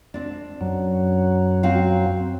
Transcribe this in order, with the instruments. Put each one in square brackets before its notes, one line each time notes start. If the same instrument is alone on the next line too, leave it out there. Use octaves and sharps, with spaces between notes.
[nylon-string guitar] C4 D4
[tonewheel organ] F#2 F#3
[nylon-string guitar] C4 F#4 F5